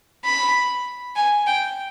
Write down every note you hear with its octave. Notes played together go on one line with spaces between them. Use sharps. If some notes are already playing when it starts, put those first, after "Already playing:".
B5
G#5
G5